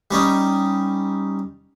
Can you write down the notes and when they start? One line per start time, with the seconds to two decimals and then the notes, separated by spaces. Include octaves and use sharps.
0.11 G3 C#4 D#4